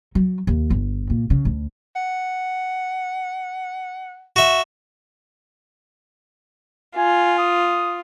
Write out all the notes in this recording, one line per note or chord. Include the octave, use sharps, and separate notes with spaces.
F#3
D#2
G1
A#2
C#3
D2
F#5
F#4 E5
F4 G#5
D#6